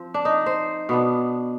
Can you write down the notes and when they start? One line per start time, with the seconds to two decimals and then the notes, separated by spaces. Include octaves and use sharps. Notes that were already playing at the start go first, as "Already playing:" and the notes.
Already playing: F3 C4
0.14 D4
0.25 D#4
0.46 C5
0.89 B2 B3 D4